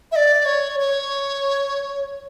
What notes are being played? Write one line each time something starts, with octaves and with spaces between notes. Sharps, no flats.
E5
D5
C#5
C#5